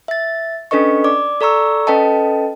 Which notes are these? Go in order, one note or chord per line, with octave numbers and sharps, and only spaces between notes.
E5 A6
C#4 D4 A4 B4 D#5 C#6
D5 D6
A4 D5 A#5 C#6 E6
C#4 A4 B4 D#5 G5 A5